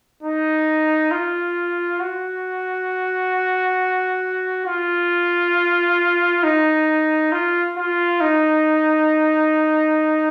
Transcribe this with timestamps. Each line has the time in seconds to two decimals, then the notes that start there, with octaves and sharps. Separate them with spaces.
0.23 D#4
1.11 F4
2.00 F#4
4.66 F4
6.43 D#4
7.32 F4
7.77 F4
8.21 D#4